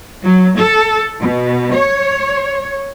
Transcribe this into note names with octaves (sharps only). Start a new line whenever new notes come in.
F#3
A4
B2
C#5